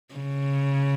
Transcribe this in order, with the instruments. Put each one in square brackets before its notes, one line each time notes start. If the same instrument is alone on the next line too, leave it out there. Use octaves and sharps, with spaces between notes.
[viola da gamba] C#3